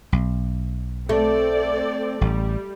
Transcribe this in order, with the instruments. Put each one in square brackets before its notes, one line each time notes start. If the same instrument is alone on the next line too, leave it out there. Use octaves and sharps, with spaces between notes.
[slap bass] B1
[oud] A3 [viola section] C4 A4 D5
[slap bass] A1 [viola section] G3